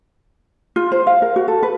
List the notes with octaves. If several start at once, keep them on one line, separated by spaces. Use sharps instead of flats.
F4
C5
F5
A#4
F#4
A4
B4